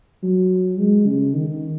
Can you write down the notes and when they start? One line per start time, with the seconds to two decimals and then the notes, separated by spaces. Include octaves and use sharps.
0.23 F#3
0.79 G#3
1.07 C#3
1.35 D#3